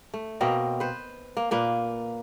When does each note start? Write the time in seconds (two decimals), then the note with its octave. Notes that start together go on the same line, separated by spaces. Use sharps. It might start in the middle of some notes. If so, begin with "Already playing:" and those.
0.14 A3
0.41 B2 A#3 C4 D#5
0.80 B4 C5
1.37 A#3
1.51 A#2 A#3 B4